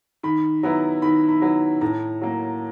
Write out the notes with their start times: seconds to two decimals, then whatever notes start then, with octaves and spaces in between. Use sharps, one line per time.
0.23 D#3 B5
0.63 F#3 B3 E4 A#5
1.02 D#3 B5
1.29 B5
1.42 F#3 B3 E4
1.81 A2 A#5
2.21 F#3 A#3